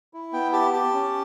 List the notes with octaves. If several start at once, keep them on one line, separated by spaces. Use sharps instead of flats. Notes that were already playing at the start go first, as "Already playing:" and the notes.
E4
B3 G5
G4 A5
G4 A5
C#4